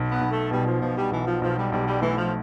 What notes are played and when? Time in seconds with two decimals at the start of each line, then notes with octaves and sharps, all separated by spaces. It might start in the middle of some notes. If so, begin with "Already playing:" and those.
Already playing: B1
0.11 B3
0.21 B1
0.31 A3
0.51 B2 G3
0.66 F3
0.81 B2 F3
0.96 G3
1.11 B1 E3
1.26 F3
1.41 B1 F3
1.57 G3
1.71 B1 G3
1.86 G3
2.02 E3 A3
2.17 F3